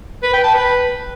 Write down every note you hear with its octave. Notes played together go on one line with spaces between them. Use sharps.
B4
G5
A5
B4